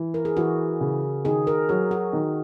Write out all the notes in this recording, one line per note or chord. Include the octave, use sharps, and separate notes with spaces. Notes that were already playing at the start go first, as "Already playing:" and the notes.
Already playing: E3
A#4
G#4
E3 F#4
C#3
D#3 G#4
A#4
F#3 G#4
F#4
D#3